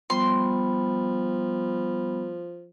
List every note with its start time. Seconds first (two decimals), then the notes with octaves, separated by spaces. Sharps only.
0.10 F3 G3 B3 B5 C6